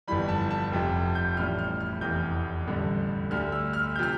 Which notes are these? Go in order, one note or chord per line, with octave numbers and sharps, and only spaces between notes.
G1 F2 E3 G3 B5
A5
A5
F1 F2 C3
G6
A1 A2 G3 F6
F6
F6
F1 E2 C3 E3 G6
A1 G2 D3 G3
D2 D3 G3 F6
E6
F6
G6
C3 F3 F6